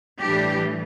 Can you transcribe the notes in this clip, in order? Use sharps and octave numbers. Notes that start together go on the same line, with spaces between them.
A2 E3 G3 D4 G4